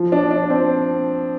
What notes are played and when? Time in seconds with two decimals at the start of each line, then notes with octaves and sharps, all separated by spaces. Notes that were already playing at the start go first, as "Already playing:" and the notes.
Already playing: F3
0.12 D4
0.31 D4
0.50 C4